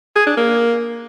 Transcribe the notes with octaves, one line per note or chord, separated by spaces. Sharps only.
G#4
D4
A#3